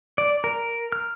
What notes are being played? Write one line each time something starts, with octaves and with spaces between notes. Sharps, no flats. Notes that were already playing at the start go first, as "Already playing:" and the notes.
D5
A#4
F6